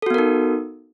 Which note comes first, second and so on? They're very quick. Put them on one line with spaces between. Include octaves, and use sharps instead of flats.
A4 F#4 B3 A#4 D#4